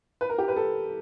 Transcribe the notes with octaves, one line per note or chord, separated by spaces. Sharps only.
B4
A#4
G4
B4
A4